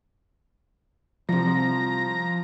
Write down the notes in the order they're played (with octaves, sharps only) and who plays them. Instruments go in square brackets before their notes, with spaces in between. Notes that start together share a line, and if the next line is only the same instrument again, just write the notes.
[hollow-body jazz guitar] C2 C3 [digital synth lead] F3 [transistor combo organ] A#5